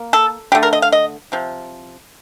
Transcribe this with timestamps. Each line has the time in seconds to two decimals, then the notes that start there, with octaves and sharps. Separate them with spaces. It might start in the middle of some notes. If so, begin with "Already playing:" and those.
Already playing: A#3
0.13 A4
0.52 D3 A3 G4
0.63 A#4
0.73 D#5
0.82 F5
0.92 D#5
1.32 C3 F3